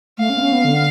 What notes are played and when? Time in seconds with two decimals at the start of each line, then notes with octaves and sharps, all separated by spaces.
0.18 A3 F5
0.30 C#4
0.37 B3
0.42 C#4
0.53 B3
0.64 D3